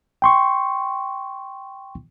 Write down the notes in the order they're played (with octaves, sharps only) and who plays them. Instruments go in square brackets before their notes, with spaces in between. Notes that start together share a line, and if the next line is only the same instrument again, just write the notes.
[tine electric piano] G5 C6 C#6